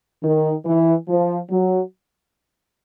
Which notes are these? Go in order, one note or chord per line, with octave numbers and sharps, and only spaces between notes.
D#3
E3
F3
F#3